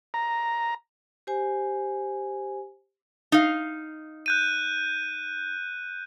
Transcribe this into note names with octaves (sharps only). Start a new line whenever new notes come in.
A#5
G4 C5 G#5
D#4 F5
F#6 G6 D#7